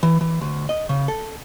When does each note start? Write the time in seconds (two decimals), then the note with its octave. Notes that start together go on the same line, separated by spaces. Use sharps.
0.03 E3
0.21 E3
0.41 D2
0.69 D#5
0.89 C#3
1.08 A4